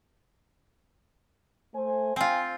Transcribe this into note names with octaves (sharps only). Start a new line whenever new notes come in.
A3 C5 G#5
C4 F4 G5 G#5